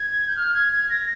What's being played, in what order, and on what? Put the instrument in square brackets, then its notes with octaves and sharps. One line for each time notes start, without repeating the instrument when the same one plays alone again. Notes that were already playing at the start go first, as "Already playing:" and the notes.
Already playing: [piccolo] G#6
G6
F6
G#6
G#6
A#6